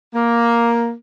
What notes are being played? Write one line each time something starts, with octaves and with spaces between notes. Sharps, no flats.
A#3